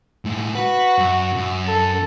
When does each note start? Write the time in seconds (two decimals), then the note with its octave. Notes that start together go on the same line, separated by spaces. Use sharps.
0.25 A2 G#3
0.55 F#4 B4
0.98 F#2
1.36 F#2
1.67 A4